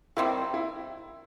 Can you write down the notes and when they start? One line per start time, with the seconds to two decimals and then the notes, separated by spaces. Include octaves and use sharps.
0.17 D#3 G3 C4 E4
0.54 E4